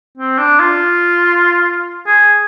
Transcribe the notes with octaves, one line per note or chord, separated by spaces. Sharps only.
C4
D4
F4
G#4